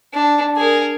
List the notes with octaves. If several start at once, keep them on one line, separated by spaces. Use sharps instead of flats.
D4
G#4 A#4